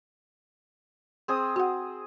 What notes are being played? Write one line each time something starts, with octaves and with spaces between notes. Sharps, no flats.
C4 G#4 D#6
F#4 F#5